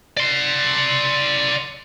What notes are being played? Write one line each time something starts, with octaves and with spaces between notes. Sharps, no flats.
D5 C6